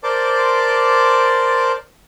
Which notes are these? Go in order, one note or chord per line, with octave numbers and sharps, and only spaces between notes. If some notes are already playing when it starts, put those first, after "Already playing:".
A#4 C5 D5 A5 C6 D6